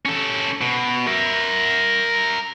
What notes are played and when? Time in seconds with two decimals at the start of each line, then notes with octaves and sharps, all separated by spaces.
0.06 C#4 A4
0.61 B2
1.07 A#4 E5